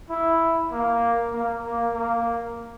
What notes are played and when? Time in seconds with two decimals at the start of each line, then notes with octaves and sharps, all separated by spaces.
0.10 E4
0.72 A#3
1.33 A#3
1.64 A#3
1.95 A#3